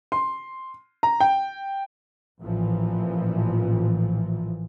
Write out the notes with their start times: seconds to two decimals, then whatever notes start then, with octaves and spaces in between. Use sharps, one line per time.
0.12 C6
1.03 A#5
1.20 G5
2.40 A1 A#2 E3 F3